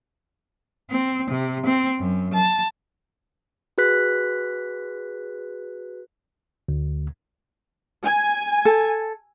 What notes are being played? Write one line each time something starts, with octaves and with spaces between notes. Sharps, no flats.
C4
C3
C4
F#2
A5
F#4 G#4 B4 F#6 B6
D2
G#5
A4